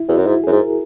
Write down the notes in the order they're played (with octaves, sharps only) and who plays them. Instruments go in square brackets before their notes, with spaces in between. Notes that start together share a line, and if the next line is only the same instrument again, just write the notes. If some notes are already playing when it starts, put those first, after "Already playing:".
Already playing: [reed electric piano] E4
[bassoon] E2 [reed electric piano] F#4
[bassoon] F#2
[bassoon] G#2 [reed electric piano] E4
[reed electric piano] G#4
[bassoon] F#2
G#2
[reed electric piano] A#4